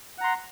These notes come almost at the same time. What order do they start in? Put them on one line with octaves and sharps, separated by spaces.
F#5 A#5 C6